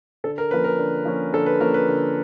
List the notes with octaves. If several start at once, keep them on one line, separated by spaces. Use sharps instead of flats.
D3 A4
A#4
F3 A#3 C#4 B4
A#4
D3
F3 A#3 C#4
D3 A4
B4
F3 A#3 C#4 A#4
B4
D3